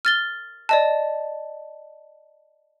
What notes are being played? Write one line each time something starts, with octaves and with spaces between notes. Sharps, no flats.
F6 A6 G7
D5 D#5 A5